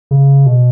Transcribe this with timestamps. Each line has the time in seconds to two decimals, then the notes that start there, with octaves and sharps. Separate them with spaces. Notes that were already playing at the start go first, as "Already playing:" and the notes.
0.11 C#3
0.46 B2